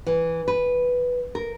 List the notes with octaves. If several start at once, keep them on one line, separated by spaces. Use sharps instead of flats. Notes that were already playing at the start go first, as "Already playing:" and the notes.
E3
B4
A#4